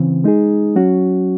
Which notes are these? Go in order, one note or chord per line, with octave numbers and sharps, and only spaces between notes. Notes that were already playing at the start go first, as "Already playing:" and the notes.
Already playing: C#3 E3 C4
G#3 D#4 G#4
F#3 C#4 F#4